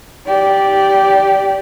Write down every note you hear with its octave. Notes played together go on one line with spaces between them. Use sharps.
G4 D5